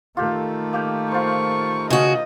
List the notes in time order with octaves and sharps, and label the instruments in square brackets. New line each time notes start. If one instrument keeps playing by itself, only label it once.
[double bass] D#3 A3 [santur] F4 G4 A4
[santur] A#3 G4 G5
[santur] F4 C5 [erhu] C#6
[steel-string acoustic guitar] C#3 F#4 [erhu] D#5